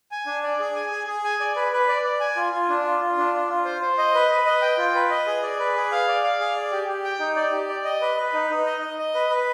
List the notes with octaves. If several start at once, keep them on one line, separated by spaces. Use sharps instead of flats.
G#5
D4
D5
G#4
G#5
G#4
G#4
G#5
D5
B4
B4
D5
D5
G#5
F4
F4
D4
F4
F4
D4
F4
F4
C5
C5
D#5
B4
B4
D#5
G5
F4
B4
D#5
G#4
D5
B4
G#4
F5
D5
F5
G#4
D5
G4
G4
G5
D#4
D5
G4
D5
D#5
B4
B4
D#4
D#4
D#5
D#5
D#5
B4
B4